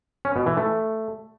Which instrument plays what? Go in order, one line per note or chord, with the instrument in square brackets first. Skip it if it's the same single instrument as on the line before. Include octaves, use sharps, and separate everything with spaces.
[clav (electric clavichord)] C#4
B2
E3
A3